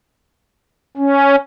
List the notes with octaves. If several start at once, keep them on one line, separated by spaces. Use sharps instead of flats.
C#4